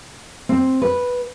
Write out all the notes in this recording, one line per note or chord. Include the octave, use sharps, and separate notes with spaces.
C4
B4